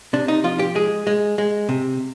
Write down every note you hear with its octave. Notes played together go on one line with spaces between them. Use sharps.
C3 D4
D#4
F3 F4
G4
G#3 G#4
G#3
G#3
C3